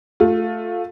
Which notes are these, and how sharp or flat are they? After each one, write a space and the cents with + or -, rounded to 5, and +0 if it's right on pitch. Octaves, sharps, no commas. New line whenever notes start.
A3 +0 F4 +20